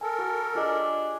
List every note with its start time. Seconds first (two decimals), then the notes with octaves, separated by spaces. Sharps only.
0.01 A4 A#4 G#5 A5
0.18 F#4
0.55 D4 F4 G4 G#4 D#5